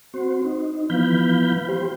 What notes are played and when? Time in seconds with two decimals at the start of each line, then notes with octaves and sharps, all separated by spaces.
0.14 C4 F#4 C5
0.44 D#4
0.90 E3 F3 B3 F5 B5 G6
1.68 G4 C5